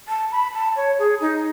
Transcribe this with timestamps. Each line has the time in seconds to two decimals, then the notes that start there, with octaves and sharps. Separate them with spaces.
0.08 A5
0.32 B5
0.53 A5
0.76 C#5
0.99 G#4
1.21 D#4